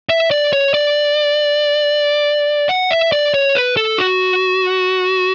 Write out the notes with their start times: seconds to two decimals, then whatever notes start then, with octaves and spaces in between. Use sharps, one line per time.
0.09 E5
0.31 D5
0.53 C#5
0.74 D5
2.69 F#5
2.91 E5
3.12 D5
3.34 C#5
3.55 B4
3.77 A4
3.98 F#4